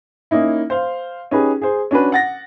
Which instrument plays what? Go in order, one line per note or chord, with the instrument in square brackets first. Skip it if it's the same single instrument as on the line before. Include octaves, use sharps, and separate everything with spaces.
[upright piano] A#3 C#4 D#4 E4
C5 F5
C#4 D#4 G4 G#4 B4
G#4 C5
C#4 D4 F#4 B4
F#5 A6 A#6